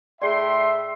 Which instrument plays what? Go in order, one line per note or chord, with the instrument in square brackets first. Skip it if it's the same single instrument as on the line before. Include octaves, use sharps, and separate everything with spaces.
[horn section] A2 G5 C6 [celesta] G#4 D5 [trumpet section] E5